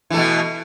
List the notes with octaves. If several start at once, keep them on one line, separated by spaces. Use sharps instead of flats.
B2 E3 A3